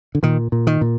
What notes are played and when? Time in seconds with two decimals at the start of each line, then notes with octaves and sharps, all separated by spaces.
0.15 D3
0.23 A#2 D#3
0.52 A#2
0.67 D#3
0.81 A#2